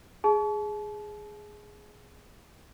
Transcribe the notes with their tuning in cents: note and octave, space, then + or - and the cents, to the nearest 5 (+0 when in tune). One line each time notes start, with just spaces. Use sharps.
G#4 +0 A5 -35